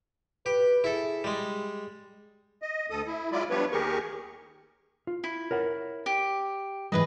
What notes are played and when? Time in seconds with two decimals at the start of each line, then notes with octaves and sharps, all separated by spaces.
0.46 G4 B4
0.84 E4 G#4 A4
1.24 G3 G#3
2.62 D#5
2.90 D2 A4 D#6
3.06 E4
3.32 F#3 G#3 E4 F4 D5
3.50 F3 G3 B3 D4 B4 C#5
3.72 D#2 G4 G#4 A#4 C#6
5.07 F4
5.24 E4
5.51 A#4 C#5 F#5
6.06 G4
6.92 G#2 E3 G3 G#4 B4 D#5